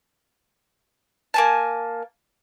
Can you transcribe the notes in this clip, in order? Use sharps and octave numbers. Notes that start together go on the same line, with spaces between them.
A#3 G#5 A5